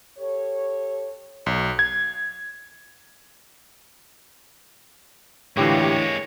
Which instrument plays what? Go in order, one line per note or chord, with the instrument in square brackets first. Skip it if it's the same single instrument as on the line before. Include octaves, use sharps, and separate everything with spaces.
[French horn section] G4 A4 C#5
[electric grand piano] B1
G#6
[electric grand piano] A2 D3 E3 [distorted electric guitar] G#3 A#3 [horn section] F4 G4 [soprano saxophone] C#5